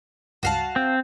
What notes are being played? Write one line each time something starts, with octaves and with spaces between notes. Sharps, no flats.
C#2 G2 F#4 F5 A5
C4